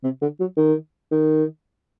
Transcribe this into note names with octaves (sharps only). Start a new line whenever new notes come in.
C3
D3
F#3
D#3
D#3